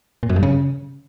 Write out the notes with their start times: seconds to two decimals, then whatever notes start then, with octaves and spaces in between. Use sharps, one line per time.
0.23 A#2
0.29 F#2
0.36 G2
0.43 C#3